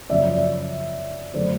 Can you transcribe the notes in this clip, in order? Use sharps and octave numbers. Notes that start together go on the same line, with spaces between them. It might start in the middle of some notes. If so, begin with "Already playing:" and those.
F#2 C#3 F3 D5 E5
D3 F#3 A3 C5 D5